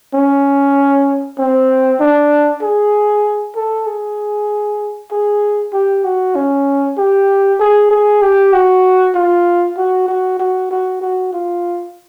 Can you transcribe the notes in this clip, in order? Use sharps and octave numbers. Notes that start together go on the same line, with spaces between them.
C#4
C4
D4
G#4
A4
G#4
G#4
G4
F#4
C#4
G4
G#4
G#4
G4
F#4
F4
F#4
F#4
F#4
F#4
F#4
F4